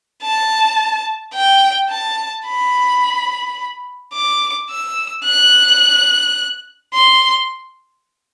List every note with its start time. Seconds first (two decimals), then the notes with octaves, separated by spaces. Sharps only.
0.23 A5
1.34 G5
1.90 A5
2.46 B5
4.14 D6
4.70 E6
5.26 F#6
6.94 C6